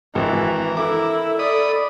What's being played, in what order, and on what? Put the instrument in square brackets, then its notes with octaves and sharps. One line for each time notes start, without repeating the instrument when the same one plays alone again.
[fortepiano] G#1 [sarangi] E3 [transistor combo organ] A#4
[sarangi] E4 [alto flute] A4 [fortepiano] D6
[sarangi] D5 [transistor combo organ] D#5 B5 D#6